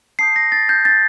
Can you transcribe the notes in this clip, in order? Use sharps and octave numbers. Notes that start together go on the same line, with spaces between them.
A5 D#6 G6 C7
A#6
A6
G6
A6